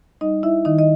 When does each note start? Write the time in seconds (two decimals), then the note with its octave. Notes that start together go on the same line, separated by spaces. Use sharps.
0.21 G3 D#4 D#5
0.43 E4 E5
0.65 D#3 D#4 D#5
0.78 D#5